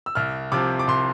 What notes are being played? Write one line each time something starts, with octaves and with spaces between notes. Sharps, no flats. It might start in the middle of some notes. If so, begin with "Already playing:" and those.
E6
C2 F6
C3 F3 C4 D6
D6
C2 C6